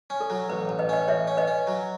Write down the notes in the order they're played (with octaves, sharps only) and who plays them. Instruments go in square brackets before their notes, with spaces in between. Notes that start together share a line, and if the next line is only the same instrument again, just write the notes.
[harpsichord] C#4
[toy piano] A4
[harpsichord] F#3
[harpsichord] A1 [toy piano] B4
[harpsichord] A1 [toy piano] B4
[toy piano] B4 D#5
[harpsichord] C#4 [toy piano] B4 D#5
[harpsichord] A1 [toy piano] C#5 E5
[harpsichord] C#4
[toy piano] B4 D#5
[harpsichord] C#4
F#3